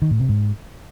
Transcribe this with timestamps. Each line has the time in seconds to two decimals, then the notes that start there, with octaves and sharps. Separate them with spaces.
0.02 D#3
0.11 A2
0.20 C3
0.29 G#2